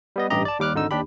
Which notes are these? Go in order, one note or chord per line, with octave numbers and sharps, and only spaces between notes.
G3 B3 D#5
A1 G2 G4 D#5 A#5
D5 A5
D#2 G3 D6 F6 F#6
G#1 D3 D#4 E6
D#2 D4 G4 B5